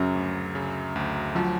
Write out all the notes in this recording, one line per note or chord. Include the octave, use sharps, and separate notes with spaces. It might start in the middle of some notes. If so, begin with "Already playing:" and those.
Already playing: F#2 C#3 F#3
D2
C#3
D2
F3 F#3